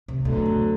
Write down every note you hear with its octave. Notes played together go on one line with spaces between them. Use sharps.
C3
D2 B2 D3 F#3
F#2